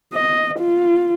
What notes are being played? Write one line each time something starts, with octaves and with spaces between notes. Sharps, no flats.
D#5
F4